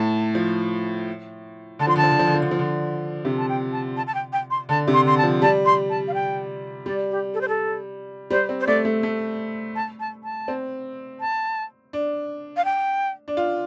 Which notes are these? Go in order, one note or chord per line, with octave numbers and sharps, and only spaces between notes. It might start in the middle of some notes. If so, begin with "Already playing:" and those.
Already playing: A2 A5
F3
D3 A5
F3 C6
D3 A5
F3
D3
F3
D3
F3
D3
F3
D3
C3
A5
G5
A5
A5
A5
G5
G5
C6
D3 A5
C3
C6
D3 C6
A5
F3
G3 A5
C6
A5
F5
G5
G3 D5
G4
A4
C5
A4
G3 C5
C4
C5
A3 D5
A3
A3
A5
A5
A5
C4
A5
D4
F5
G5
D4
F4